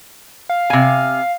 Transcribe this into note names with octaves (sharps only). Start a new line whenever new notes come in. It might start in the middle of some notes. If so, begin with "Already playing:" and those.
F5
C3 G#5